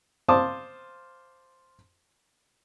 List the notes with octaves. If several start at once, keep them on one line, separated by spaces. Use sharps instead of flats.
C5 F5 A5 C6 D6 D#6